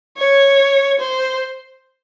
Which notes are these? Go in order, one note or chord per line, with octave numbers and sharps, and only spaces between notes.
C#5
C5